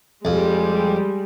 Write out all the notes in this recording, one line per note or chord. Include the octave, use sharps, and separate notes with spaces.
F2 G3 G#3